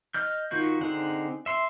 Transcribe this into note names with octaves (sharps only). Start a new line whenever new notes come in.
D#5 F6 G6
D#3 F4 F#4 G6
D3 C4 D#4 G#4 F#5
E5 C6